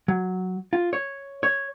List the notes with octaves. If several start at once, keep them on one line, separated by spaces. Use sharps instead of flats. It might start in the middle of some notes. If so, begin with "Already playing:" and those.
F#3
F4
C#5
C#5